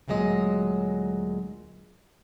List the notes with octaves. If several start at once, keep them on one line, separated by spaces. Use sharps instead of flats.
D2 A#2 F#3 G#3 D#5